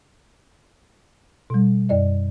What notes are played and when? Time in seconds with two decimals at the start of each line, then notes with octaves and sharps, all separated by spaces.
1.50 B2 G3
1.89 F#2 D5 D#5